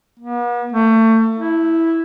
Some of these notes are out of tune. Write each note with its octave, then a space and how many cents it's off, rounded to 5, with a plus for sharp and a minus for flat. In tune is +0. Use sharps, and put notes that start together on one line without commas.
B3 -45
A3 +30
E4 -5